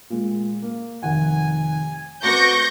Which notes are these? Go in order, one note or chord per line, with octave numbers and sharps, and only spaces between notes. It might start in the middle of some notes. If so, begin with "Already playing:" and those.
A#2 G#3
A#3
F1 D#3 F#5 G#5
A3 C4 F#4 B4 C#6 D6 G6 A#6